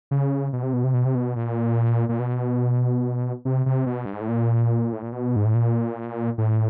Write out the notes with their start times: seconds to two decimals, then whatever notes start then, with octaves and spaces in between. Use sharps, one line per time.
0.11 C#3
0.53 B2
0.63 C3
0.73 B2
0.84 C3
0.94 B2
1.05 C3
1.15 B2
1.36 A#2
2.09 A#2
2.20 B2
3.45 C3
3.66 C3
3.86 B2
4.06 G2
4.13 G#2
4.21 A2
4.29 A#2
4.93 A2
5.02 A#2
5.12 B2
5.36 G#2
5.45 A2
5.54 A#2
6.38 A2